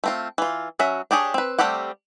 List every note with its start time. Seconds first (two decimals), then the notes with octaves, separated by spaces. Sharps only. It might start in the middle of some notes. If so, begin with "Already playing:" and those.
0.04 A3 C4 F4
0.38 E3 F4
0.79 F#3 C#4 F#4 E5
1.11 D4 G4 G#4 C#5
1.34 C4 B4
1.58 G3 A3 C4 G4 F#5